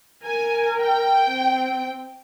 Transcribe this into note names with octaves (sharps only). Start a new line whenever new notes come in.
A#4 G#5
G5
C4